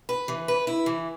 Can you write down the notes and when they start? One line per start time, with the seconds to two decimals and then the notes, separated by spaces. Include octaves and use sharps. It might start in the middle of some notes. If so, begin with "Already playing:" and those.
0.09 B4
0.28 E3
0.48 B4
0.67 E4
0.86 E3